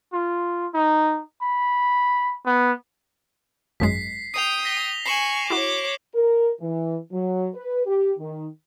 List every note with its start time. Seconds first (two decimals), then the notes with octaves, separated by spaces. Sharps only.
0.13 F4
0.74 D#4
1.42 B5
2.46 B3
3.80 G#1 F#2 G#3 B6 C7
4.34 G5 D#6 C7 F7
4.65 A#6 B6 G7
5.05 G#5 C#6 C7 E7 F#7
5.50 E4 F#4 C#5 D6
6.14 A#4
6.60 E3
7.11 F#3
7.54 B4
7.86 G4
8.18 D#3